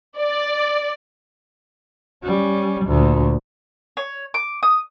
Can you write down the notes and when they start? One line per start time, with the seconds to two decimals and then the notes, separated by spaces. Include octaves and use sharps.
0.17 D5
2.24 G3 C#4
2.85 D2 A#2
3.97 C#5
4.34 D6
4.63 D#6